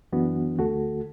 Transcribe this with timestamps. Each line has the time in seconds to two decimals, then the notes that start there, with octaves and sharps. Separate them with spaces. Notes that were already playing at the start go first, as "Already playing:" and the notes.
0.13 F#2 E3 B3 D4 F#4
0.57 D2 D3 A3 F#4 A4